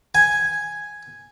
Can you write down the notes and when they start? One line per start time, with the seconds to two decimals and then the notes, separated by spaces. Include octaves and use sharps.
0.15 G#5